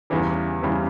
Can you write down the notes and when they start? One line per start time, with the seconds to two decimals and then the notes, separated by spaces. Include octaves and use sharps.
0.10 E2 C#3 E3 G3
0.63 E2 C#3 E3 G3